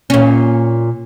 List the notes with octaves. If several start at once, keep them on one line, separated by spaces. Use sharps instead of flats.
A#2 C#4